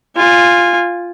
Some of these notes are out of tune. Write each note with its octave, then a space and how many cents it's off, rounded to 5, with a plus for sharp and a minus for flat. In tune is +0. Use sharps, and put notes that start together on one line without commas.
F4 +0 G#5 -20